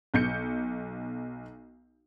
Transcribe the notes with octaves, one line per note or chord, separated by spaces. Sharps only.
B1 G6 C#7